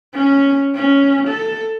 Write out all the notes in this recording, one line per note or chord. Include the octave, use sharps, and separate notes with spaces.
C#4
C#4
A4